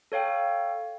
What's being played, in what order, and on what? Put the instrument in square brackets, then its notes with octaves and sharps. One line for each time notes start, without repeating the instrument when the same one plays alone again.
[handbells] A4 C#5 F5 G5